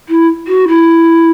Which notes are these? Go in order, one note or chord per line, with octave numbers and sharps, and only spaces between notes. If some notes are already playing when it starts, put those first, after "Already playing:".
E4
F#4
E4